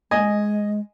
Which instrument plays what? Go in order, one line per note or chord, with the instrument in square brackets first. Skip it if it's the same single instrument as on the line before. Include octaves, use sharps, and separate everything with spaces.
[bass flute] G#3 [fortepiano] D#5 G#5